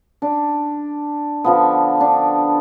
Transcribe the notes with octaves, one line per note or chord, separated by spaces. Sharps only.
D4
D3 F3 B3
D4